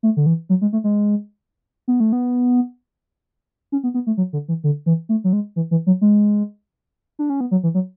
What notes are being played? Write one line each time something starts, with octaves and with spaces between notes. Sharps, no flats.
A3
D3
E3
F#3
G#3
A3
G#3
B3
A3
B3
C#4
B3
B3
A3
F#3
D3
E3
D3
E3
A3
F#3
G#3
E3
E3
F#3
G#3
D4
C#4
B3
F#3
E3
F#3